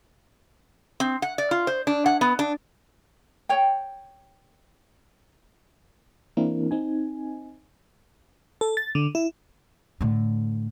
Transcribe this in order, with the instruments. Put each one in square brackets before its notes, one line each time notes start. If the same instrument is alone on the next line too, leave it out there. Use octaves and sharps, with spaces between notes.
[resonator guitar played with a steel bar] C4
F#5
D5
F4
C5
D4
F#5
B3
D4
[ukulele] C#5 G5
[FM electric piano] E3 A#3 C4 D4 E4 A#4
C4 D#4 G#5
A4
A6
D3
E4
[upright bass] A2 D3